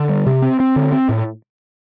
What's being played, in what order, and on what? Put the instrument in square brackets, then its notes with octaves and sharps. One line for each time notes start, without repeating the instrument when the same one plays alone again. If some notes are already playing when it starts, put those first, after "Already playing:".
Already playing: [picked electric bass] D3
G3
C3
C4
C4
D3
C4
A2